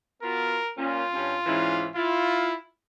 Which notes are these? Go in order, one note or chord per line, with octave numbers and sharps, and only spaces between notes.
B3 F4 F#4 A#4
A#2 C#4 F4
G2 C#4
G#2 E3 C#4
E4 F4